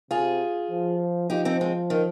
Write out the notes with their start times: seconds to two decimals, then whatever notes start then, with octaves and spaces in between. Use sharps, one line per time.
0.11 C3 F4 G#4
0.71 F3
1.30 F3 D#4 G4
1.45 C4 D#4
1.61 G#3 C4
1.90 D#3